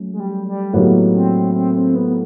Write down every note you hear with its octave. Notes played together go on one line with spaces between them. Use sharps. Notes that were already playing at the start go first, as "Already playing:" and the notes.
Already playing: F#3 A3 C#4
G#3
G3
G3
A2 F#3 A#3 B3 D#4 G4
C4
C4
C4
B3